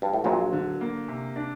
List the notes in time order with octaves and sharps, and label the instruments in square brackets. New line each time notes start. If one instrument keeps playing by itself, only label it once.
[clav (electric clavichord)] G2
A2
[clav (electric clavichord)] A#1 A#2 [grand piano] F#3
[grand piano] D3
A#3
C3
D4